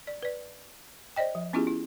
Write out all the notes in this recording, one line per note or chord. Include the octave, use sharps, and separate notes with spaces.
D5
B4 D5
C5 D5 D#5 G5
F3
B3 C#4 E4 F4 G4 G#4
E4